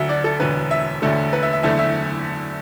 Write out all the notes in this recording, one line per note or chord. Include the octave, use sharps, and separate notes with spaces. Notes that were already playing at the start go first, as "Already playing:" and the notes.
Already playing: D2 D3 F#3 E5 F#5
D5
A4
E1 D2 D3 B4
E5
E1 D2 D3 A3
B4
E5
E5
F#1 E2 D3 A3 E5
E5